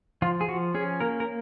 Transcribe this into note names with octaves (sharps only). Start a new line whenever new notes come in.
F3 F4
G#4
F3 F#4
C#4 G#4
A#3 A#4
A#4